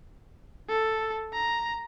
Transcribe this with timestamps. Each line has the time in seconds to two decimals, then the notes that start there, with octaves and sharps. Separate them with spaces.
0.69 A4
1.33 A#5